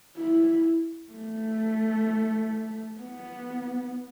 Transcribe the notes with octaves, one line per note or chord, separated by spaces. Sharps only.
E4
A3
B3